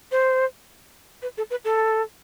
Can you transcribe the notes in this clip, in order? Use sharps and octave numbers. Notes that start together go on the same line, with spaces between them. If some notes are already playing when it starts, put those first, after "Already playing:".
C5
B4
A4
B4
A4